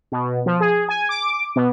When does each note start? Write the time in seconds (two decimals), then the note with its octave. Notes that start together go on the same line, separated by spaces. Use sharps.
0.12 B2
0.46 F3
0.60 G#4
0.89 G#5
1.09 D6
1.56 B2